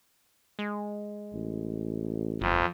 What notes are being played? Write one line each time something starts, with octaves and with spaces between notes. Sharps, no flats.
G#3
A1
G1 F2